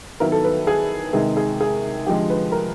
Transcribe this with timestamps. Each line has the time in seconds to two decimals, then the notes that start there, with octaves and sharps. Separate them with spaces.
0.20 D#3 F#3 B3 E4 A#4
0.32 A4
0.44 B4
0.67 G#4
1.13 C3 D#3 G#3 G#4
1.37 G#4
1.61 G#4
2.06 D3 G4
2.09 F3 G#3
2.30 B4
2.52 A#4